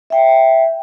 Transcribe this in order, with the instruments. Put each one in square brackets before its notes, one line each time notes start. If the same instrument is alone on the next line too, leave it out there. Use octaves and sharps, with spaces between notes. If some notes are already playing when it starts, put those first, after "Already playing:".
[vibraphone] E5 G5